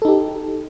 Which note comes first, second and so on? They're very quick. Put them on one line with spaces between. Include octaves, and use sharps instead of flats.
A4 D#4 G4